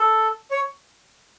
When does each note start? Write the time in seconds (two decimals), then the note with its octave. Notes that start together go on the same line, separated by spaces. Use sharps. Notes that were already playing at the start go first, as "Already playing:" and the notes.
Already playing: A4
0.51 C#5